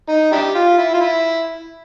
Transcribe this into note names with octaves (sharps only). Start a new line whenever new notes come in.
D#4
D4 E4 G4
F4
E4
F4
E4